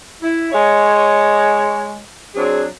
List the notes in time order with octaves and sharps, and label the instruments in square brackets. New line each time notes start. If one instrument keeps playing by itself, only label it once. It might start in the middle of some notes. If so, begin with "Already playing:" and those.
[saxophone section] E4
G#3 C#5
F#3 C4 D4 G#4